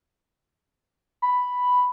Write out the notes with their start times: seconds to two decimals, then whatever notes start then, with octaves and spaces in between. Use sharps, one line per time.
1.22 B5